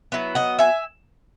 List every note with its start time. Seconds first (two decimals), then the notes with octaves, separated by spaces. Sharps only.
0.12 F#3 B3 E4
0.35 D#5 F#5
0.59 E5 G#5